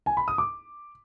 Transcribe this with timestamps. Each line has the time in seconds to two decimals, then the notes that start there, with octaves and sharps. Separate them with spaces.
0.06 G#5
0.17 B5
0.28 D#6
0.38 D6